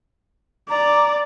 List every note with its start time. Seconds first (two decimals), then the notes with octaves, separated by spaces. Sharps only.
0.70 D5 A#5